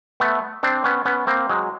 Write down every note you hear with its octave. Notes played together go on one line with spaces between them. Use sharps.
A3 B3
C4 D4
B3 C#4
B3 C#4
A#3 C4
F#3 G#3